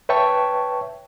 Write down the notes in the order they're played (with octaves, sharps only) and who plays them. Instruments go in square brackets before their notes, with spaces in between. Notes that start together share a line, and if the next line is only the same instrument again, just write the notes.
[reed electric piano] B4 C#5 E5 G5 A5 C#6